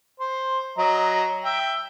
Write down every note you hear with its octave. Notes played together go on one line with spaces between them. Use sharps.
C5
F#3 D#5 A#5
E5 G5